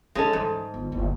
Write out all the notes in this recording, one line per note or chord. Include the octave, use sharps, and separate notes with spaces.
G#3 C#4 D#4 A4
G#2 E3 G3
G1
F#1 D#2